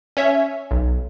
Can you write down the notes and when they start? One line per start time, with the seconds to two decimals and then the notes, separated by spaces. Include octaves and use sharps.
0.17 C#4 C#5 E5
0.71 B1